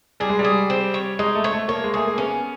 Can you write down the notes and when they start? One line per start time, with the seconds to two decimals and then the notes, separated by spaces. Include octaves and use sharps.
0.20 G3 G#4
0.29 G#3
0.39 G3
0.45 G#4
0.70 C4
0.94 C#5
1.19 G#3 D#4
1.35 A3
1.44 C#5
1.53 A3
1.68 A#3 C#5
1.84 G#3
1.94 A3 G#4
2.07 A#3
2.18 B3 C#4